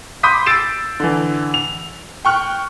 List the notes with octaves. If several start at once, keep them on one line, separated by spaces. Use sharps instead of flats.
B5 C6 D6 D#6 G6 B6
E6 A6 C7 D7 E7
D3 E3
F7
G5 C#6 F6 F#6